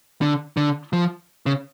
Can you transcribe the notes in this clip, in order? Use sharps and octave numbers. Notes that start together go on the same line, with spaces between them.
D3
D3
F3
C#3